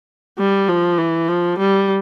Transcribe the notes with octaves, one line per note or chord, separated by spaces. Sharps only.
G3
F3
E3
F3
G3